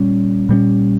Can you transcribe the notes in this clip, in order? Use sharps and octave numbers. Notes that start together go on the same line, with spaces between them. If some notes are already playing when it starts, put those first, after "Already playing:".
Already playing: A#2 G3 C#4
A#2 G3 A#3 C#4